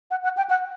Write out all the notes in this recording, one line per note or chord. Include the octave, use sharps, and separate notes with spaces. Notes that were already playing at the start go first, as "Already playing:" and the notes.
F#5
F#5
G5
F#5